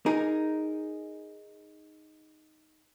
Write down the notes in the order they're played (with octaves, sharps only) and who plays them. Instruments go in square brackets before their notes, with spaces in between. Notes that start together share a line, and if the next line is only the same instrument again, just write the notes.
[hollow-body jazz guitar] D#4 G#4 A#4